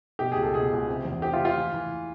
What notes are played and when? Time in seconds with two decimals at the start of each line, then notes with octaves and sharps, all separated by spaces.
0.19 B2 G4
0.32 C#2 G#4
0.43 A4
0.54 B2 G#4
0.72 C#2
0.88 C3
1.05 E2
1.22 C3 G4
1.33 F4
1.40 E3
1.45 F4
1.57 E3
1.74 E3